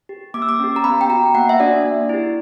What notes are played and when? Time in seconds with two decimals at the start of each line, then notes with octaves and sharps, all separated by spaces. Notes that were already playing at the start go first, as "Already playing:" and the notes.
0.09 G4
0.34 A#3 D6
0.42 E6
0.49 D6
0.60 C#4 G4
0.76 A#5
0.84 B3 B5
1.01 G5
1.09 F#4 A#5
1.35 A#3 F#5
1.49 E5
1.59 D4 F#4 D5
1.84 A#3
2.09 E4 G4